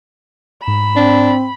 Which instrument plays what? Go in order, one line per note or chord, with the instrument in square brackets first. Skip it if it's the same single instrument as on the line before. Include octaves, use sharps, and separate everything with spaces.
[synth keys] G#2 A#5 E7 [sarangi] B5
[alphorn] C4 [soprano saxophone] D4